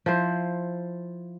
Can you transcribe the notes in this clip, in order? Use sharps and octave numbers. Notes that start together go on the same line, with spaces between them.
F3 E4 C5